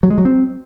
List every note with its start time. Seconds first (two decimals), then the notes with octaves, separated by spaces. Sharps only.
0.03 F#3
0.10 G#3
0.18 F#3
0.25 C4